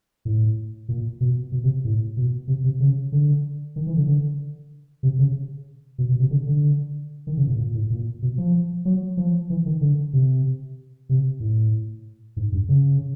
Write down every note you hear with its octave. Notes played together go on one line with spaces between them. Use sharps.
A2
A#2
B2
B2
C3
A2
B2
C3
C3
C#3
D3
D#3
E3
D3
D3
C3
C#3
B2
B2
C3
D3
D3
D#3
C#3
A#2
A#2
A2
A#2
B2
F3
F#3
F3
E3
D#3
D3
C3
C3
A2
G#2
G2
C#3